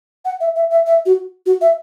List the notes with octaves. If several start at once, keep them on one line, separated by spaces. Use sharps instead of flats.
F#5
E5
E5
E5
E5
F#4
F#4
E5